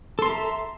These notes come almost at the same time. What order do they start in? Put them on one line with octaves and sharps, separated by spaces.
A4 C6 A#5 E5